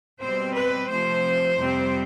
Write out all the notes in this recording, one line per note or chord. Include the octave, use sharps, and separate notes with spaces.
B2 G3 C4 C5
B4
C3 F3 A3 C5
F2 C3 G3 C4